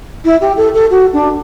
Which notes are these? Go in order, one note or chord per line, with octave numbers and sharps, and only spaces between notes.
E4
G4
A4
A4
F#4
D4